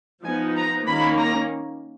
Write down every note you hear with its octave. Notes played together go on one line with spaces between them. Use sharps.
F3 B3 D#4 G#5
A#5
D#3 A#3 C#4 B5
A#5